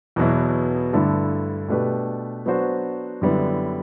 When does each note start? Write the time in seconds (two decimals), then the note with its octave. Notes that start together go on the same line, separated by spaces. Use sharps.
0.16 E2 B2 F#3 B3 E4
0.93 G2 D3 A3 E4 A4
1.69 B2 A3 D4 G4 B4
2.46 F#3 B3 D4 F#4 C5
3.22 F#2 D3 G3 B3 E4